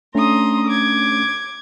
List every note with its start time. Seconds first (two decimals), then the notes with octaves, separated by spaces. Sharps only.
0.15 A3 C#4 D4 A#5 C6 D#6
0.67 D6 G#6